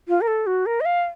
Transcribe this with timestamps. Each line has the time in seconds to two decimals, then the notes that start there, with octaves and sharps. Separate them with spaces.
0.08 F4
0.21 A#4
0.28 A4
0.47 F#4
0.66 A#4
0.81 D#5
0.85 F5